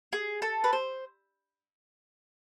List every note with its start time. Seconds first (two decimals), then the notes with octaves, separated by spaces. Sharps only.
0.13 G#4
0.42 A4
0.64 B4
0.73 C5